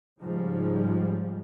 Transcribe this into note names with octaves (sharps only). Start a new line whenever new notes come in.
G#2 C#3 F3 G3 G#3